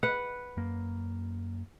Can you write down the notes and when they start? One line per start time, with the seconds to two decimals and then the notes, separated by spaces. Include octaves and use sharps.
0.03 B4 F#5
0.57 F#2 A#3